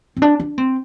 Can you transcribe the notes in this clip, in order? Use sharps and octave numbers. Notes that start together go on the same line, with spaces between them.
C4
D4
D4
C4